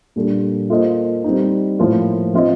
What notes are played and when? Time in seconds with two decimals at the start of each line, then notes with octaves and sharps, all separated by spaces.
0.16 A#2 G3 D4 A4
0.70 A#3 F4 A4 C5 D#5
1.24 G3 C4 D#4
1.79 A2 F3 A#3 F4 C5
2.34 F3 C4 F4 C5 D#5